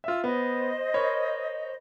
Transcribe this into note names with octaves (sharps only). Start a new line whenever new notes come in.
F4 E5 E6
B3 C5 D#5
A#4 C#5 B5